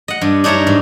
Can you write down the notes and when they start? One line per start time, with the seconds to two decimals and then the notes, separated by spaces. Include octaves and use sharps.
0.08 D#5 F#5
0.21 G2
0.44 D4 D#4 C#5 E5 A#5
0.67 G#2